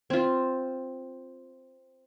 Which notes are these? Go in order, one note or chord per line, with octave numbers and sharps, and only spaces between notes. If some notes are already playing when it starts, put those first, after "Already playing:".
C4 F4